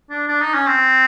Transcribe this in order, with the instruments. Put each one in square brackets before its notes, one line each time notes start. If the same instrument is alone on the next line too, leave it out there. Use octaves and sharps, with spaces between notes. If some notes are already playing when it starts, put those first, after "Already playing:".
[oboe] D4
D4
D#4
C#4
C4